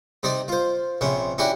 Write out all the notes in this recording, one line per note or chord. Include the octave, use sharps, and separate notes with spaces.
C3 D#4 D5
F4 C5
A#1 C3 C#4
C#4 D4 E4 F#4 G4